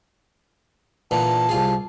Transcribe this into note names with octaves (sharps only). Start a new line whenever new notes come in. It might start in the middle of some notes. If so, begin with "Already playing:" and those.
A#2 D3 E3 A5
C2 F4 G#4